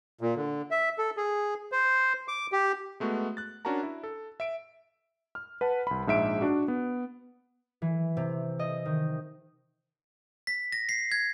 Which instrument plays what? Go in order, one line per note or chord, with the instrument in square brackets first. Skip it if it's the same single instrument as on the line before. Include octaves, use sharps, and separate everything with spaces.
[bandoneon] A#2
D3
E5
A4
G#4
C5
D6
G4
[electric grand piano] G#3 A3 B3 F#4
F#6 A6
C#4 D4 F#4 A#4 A5 A#5
E4
A4
E5 D7
F6
B4 F#5 A5
C2 B5
A#1 G#2 E5 D7
D4 F#4
B3
[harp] E3
C3
D#5
D#3
[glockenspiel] B6
A#6
C7
G#6